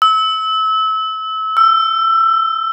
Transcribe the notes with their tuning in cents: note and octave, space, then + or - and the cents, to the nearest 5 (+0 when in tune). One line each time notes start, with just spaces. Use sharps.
E6 -30
E6 +20